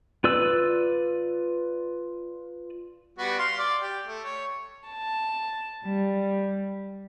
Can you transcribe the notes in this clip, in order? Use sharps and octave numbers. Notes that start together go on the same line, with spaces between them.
F4 B4 D5 E6
G3 B3 F#4
F5 C6
D5
G4
A3
C#5
A5
G3